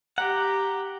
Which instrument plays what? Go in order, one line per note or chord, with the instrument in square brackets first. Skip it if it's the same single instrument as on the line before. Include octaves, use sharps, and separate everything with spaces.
[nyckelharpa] G4 [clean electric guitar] F#5 [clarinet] A#5